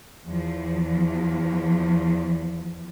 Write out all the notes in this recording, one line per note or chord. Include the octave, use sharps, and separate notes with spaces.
E2 F3